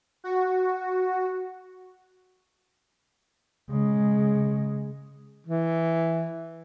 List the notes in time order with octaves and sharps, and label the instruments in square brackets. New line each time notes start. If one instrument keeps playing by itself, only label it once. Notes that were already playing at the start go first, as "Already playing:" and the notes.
[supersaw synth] F#4
[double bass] C#3 G#3
[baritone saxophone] E3